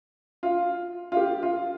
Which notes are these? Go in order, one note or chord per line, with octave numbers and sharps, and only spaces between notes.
F4
F4
G4
F4